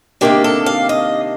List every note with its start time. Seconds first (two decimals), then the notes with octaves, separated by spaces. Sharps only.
0.21 C3 D#3 A#3 D4 G4
0.44 A4
0.66 F5
0.89 D#5